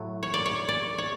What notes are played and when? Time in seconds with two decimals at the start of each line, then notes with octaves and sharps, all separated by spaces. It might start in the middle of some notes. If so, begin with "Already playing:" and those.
Already playing: A2 F#3 A3
0.23 C#5
0.34 D5
0.46 C#5
0.69 D5
0.98 C#5